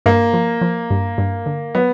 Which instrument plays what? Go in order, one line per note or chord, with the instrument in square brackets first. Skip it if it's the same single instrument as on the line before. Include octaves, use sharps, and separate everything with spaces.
[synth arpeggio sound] G2 [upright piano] A#3
[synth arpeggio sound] F3
F3
G2
G2
D3
[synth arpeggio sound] F#3 [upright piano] B3